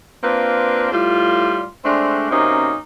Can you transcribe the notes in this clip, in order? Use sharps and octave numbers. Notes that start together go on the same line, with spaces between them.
A#3 C4 D4 F4 B4
A2 G3 F4
G#3 A3 C4 D4
F#2 C3 A#3 C#4 D#4